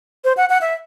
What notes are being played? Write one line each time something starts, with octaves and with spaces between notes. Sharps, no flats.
C5
F#5
F#5
E5